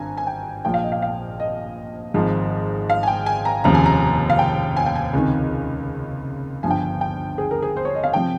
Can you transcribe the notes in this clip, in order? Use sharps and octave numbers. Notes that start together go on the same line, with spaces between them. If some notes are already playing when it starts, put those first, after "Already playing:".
Already playing: G#1 G2 G#5 A#5
G#5
G5
A#1 A#2 F3 G5
F5
D#5
F5
F5
D#5
G#1 G#2 F3
F5
G#5
G5
G#5
A#5
F1 D#2 C#3 F3 A#5
G#5
A#5
F5
G5
G#5
G5
G#5
C#2 C3 D#3
G1 G2 F3 G#5
G5
G#5
G5
G#4
A#4
G#4
C5
C#5
D#5
F5
C3 F3 G5